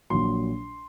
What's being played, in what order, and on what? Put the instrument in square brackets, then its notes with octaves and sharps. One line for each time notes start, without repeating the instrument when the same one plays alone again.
[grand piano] A#1 A#2 F#3 C6